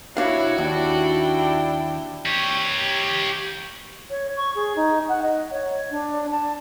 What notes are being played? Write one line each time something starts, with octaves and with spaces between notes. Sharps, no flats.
C2 D4 E4 F#4 C#5 F5
D#2 D4 E4 G5
G4 C#5
C#5
C#6
G#4
D#4
F#5
D#5
C#5
D4
A5